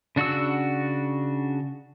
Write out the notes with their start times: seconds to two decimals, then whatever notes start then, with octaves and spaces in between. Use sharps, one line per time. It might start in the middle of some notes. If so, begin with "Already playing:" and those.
0.16 C#3 D4 F#4 F#5 E6